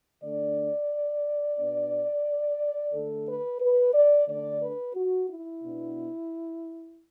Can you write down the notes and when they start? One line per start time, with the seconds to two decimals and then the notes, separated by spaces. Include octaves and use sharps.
0.23 D3 A3 D4 D5
1.58 B2 B3 D4
2.93 D3 A3 D4 A4
3.26 B4
3.60 B4
3.94 D5
4.28 D3 A3 D4 D5
4.61 B4
4.95 F#4
5.29 E4
5.63 B2 B3 D4